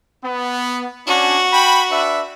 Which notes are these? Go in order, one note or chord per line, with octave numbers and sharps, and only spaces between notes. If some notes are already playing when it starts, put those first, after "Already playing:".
B3
C#4 D4 F#4
G5 B5
D4 B4 E5